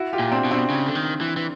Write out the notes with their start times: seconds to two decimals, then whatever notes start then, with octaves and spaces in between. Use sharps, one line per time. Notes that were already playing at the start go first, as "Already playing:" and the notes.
Already playing: E4 F#4
0.13 F4 G4
0.19 A#2
0.32 C4 D4
0.45 B2
0.51 C4 D4
0.70 C#3
0.86 D3
0.95 D#3
1.21 E3
1.37 E3